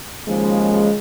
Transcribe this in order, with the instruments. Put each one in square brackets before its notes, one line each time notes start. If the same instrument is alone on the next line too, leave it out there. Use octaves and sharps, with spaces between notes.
[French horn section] D#2 C#3 F3 G#3